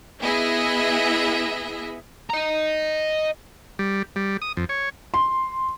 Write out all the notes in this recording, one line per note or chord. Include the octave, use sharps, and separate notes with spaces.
B3 E4 G#4 D#5 E5
D#5 A#5
G3
G3
D#6
F2
C#5
C6